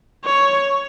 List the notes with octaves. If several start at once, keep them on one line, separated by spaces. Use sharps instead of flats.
C#5